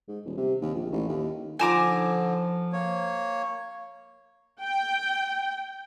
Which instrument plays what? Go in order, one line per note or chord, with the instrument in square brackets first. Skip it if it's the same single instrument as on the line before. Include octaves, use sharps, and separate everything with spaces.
[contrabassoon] G#2
D#1
C3
D#2
A#1
A1
D#2
[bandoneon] D3 [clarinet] F3 [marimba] D#4 F4 A4 [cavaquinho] G#5 A#5 D6
[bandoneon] A#3 C#5
[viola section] G5